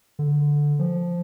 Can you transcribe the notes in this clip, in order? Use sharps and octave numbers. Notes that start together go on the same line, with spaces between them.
D3
F3